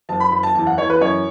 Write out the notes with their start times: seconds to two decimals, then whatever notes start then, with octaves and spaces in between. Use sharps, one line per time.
0.09 F#1 A5
0.20 B5
0.32 F#1 B5
0.43 A5
0.55 E2 A5
0.67 F#5
0.78 E3 C#5
0.90 B4
1.01 F#2 C#5